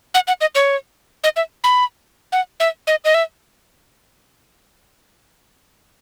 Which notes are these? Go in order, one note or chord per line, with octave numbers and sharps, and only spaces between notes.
F#5
F#5
D#5
C#5
D#5
E5
B5
F#5
E5
D#5
D#5
E5